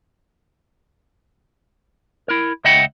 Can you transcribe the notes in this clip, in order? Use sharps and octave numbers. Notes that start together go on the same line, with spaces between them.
E4 A#4
C#2 D#5 E5 F#5 G5